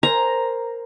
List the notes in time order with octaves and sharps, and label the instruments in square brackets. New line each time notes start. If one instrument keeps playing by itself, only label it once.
[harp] A#4 C5 G#5 [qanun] A#5